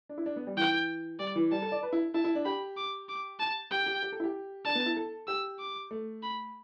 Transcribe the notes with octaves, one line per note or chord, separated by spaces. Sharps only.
D4
E4
D4
B3
G3
E3 G5
G3 D5
E3
G3 A5
A4
D5
B4
E4
E4 A5
E4
D4
G4 B5
D6
D6
A5
G4 G5
G4
G4
A4
E4
G4
D4 A5
B3
E4
A4
G4 E6
D6
A3
B5